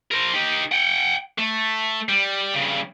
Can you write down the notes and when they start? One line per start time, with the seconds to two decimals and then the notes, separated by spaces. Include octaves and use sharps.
0.11 A#4 C5
0.34 D#4 G4
0.72 F#5 G5
1.38 A3
2.09 G3
2.54 G2 C#3